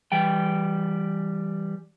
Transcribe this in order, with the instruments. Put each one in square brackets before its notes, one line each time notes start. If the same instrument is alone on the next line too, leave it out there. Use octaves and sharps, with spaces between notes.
[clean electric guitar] E3 G3 G5